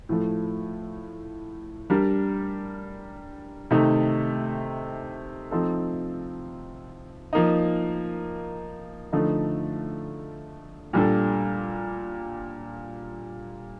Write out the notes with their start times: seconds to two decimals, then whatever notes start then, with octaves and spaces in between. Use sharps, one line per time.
0.09 A2 F3 A3
1.90 G3 D4 G4 A#4
3.71 C3 D#3 A3 D#4
5.51 F3 C4 D#4 A4
7.33 F3 A#3 D#4
9.13 D3 F3 A3 D#4
10.93 A#2 G3 D4 A4